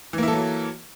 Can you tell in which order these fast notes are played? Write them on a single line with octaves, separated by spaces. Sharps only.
E3 A#3 E4 A4 F#3